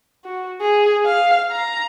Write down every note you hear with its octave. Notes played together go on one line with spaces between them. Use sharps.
F#4
G#4
F5
A#5